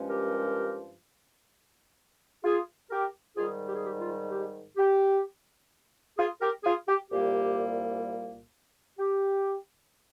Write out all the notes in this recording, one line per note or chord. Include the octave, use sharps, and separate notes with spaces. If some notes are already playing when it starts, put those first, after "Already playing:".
Already playing: G2 F3 G#3 C#4
G4 A#4
F4 G#4
G4 A#4
G#2 D#3 G3 F4 G#4
G4
G#4
G4
F4
G4
G4
F4 G#4
G4 A#4
F4 G#4
G4
C2 A#2 G3 A#3 G4
G4